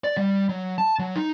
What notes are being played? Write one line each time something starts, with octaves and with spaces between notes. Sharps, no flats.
D5
G3
F#3
A5
F#3
D#4